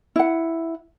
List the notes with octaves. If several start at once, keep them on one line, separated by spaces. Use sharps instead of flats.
E4 F#5